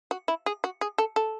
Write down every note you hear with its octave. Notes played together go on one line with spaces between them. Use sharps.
F#4
E4
G#4
F#4
G#4
A4
A4